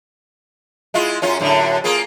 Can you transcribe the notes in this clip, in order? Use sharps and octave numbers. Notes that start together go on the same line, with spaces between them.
G#3 E4 F4
F#2 C#4 F4
F#2 A2 D3
A#3 F4 G#4